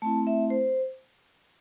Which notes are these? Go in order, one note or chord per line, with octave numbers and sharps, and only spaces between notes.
A3 C4 E4 A5
E5
C5